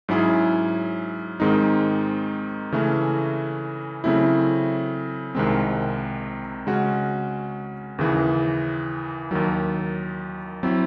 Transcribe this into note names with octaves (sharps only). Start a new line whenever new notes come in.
G#2 F#3 C#4 E4 G#4
G#2 D#3 G#3 C4 D#4
C#3 E3 A3 C#4
C#3 F#3 A3 C4 E4
C2 C3 D#3 G#3 C4
C#3 G#3 C#4 F#4
D#2 C#3 E3
D#2 D#3 F#3
F#3 C4 E4